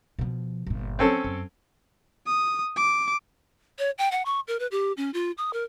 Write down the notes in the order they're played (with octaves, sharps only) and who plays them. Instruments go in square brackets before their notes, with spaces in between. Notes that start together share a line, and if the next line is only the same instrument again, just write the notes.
[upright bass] B2 F3
G1 A#2
[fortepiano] C4 C#4 A4
[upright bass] F#2
[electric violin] D#6
D6
[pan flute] C#5
G5
F#5
C#6
A#4
B4
G4
C#4
F4
D#6
A#4